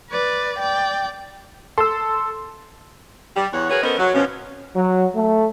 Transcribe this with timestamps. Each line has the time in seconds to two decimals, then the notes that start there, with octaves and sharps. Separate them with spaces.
0.10 B4 D5
0.60 D5 G5
1.78 A4 C6 E6
3.36 G3
3.53 E2 C#5 F#5
3.70 F#4 G#4 A#4 B4 C#5
3.82 B3 C#4 A4 A#4 C5 D#5
3.98 F#3
4.15 B2 F3 C#4
4.75 F#3
5.15 A3